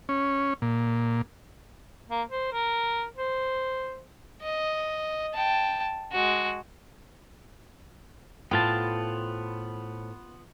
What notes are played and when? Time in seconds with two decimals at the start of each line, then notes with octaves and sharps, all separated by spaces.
0.09 C#4
0.62 A#2
2.10 A#3
2.29 C5
2.52 A#4
3.16 C5
4.42 D#5
5.34 G5 A5
6.12 G#3 F#4
8.51 A2 B3 F4 C5 G5 A5